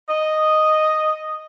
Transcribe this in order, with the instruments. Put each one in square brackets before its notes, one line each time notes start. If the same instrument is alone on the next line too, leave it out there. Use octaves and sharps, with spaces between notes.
[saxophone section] D#5